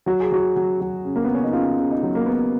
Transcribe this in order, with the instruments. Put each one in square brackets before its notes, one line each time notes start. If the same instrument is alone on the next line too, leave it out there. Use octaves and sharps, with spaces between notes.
[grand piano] F#3 F#4
G#4
F#3 F#4
F#3
F#3
C#3
A#3
C#3 B3
C#4
D#4
C#3 F4
C#3
D#4
F#3
A#3
C#3 B3